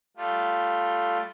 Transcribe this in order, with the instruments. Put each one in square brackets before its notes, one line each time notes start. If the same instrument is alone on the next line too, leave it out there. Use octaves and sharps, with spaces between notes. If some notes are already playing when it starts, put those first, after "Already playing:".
[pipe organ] G3 A3 F4